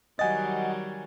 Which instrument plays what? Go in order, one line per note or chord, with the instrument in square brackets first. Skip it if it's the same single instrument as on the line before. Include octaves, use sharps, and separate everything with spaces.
[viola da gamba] D#3 F#3 G3 [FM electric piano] D#5 F#5 [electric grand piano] G#5 A6